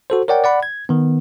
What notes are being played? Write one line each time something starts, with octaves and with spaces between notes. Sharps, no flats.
F#4 A4 C5
A#4 C#5 D5 F#5 G5
D5 F#5 B5
G#6
D#3 B3